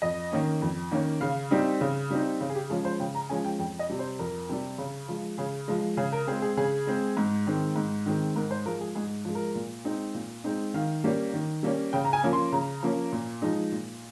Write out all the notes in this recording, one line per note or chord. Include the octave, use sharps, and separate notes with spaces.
F2 D#5
D#3 A#3 C#4
F2
D#3 A#3 C#4
C#3 F5
G3 C4 D#4
C#3
G3 C4 D#4
C#3
G#4
G4
F3 G#3 C#4 G#4
C5
C#3 G5
A#5
F3 G#3 C#4 G#5
G5
F2 G5
D#5
C3 G3
C5
F2 A#4
C3 G3
C#3
F3 G#3
C#3 G#4
F3 G#3
C#3 G#4
A#4
G#3 C4 G#4
G#4
C#3 G#4
G#3 C4
G#2
D#3 G#3 C4
G#2
D#3 G#3 C4
G#2 A#4
C5
F3 G#3 A#4
G#4
G#2 G#4
F3 G#3
A#4
A#2
G#3 C4 D#4
A#2
G#3 C4 D#4
D#3 F5
G3 A#3 C#4
D#3
G3 A#3 C#4
C#3 G5
A#5
G#5
F3 A#3 C#4
C6
C#3 A#5
F3 A#3 C#4
A#2
F3 G#3 D#4
A#2